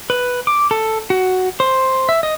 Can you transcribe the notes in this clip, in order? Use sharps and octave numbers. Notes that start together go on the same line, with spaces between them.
B4
D6
A4
F#4
C5
E5
D#5